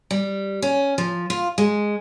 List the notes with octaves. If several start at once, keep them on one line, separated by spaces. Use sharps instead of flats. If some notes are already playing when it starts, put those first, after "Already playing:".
G3
C#4
F3
F4
G#3